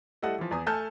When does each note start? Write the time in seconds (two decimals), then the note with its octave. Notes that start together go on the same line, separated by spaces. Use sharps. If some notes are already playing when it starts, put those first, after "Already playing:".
0.22 G3 A3 E4 A4 D#5 F#5
0.39 E3 F3
0.51 E2 G#5 D#6
0.66 A3 A4 G#5 A5 F6 G6